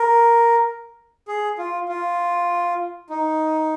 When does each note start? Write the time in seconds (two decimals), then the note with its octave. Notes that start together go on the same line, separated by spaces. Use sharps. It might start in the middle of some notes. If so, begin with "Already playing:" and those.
Already playing: A#4
1.28 G#4
1.58 F4
1.89 F4
3.10 D#4